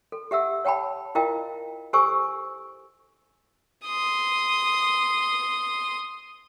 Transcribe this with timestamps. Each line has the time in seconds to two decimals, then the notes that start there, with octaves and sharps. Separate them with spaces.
0.12 A4
0.31 G4 E5 F#5 E6
0.65 C#5 F#5 G5 A5 B5
1.15 E4 F4 A#4 D#5 F5 G5
1.93 G4 A4 C5 G#5 C#6 E6
3.86 C6 D#6